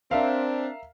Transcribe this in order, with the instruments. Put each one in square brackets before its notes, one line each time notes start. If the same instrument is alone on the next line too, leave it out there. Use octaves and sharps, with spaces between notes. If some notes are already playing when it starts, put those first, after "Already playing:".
[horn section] C4 D4 [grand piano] A#4 E5 F5